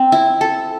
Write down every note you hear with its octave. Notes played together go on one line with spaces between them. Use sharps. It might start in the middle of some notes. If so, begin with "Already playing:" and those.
Already playing: C4
E4
A4